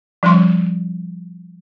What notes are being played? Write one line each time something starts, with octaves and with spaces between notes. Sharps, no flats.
F3 G3 C#4 C6